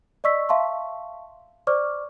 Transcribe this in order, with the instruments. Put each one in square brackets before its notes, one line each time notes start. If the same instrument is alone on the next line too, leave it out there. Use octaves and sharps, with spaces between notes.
[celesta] D5 D#5 C#6 E6 B6
E5 F5 A5 C6 C#6
C5 D5 C#6 D6 F6